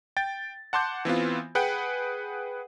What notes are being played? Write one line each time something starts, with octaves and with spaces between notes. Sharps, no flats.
G5 A6
F#5 A5 C6 D6 G6
E3 B3 C4 F4
G#4 B4 F#5 G5